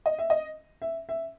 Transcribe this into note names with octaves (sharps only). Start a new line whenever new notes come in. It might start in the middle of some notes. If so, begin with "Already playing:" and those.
D#5
E5
D#5
E5
E5